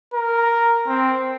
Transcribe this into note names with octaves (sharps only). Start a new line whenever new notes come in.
A#4
C4